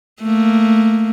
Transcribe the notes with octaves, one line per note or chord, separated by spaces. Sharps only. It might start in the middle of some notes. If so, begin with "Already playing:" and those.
A3 A#3